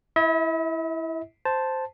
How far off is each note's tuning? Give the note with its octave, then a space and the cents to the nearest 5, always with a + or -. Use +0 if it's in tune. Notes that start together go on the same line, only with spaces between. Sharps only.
E4 +0 E5 -45
C5 -5 A5 +0